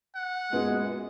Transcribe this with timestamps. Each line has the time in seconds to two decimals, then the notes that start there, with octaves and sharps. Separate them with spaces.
0.15 F#5
0.52 F#2 A#2 G#3 B3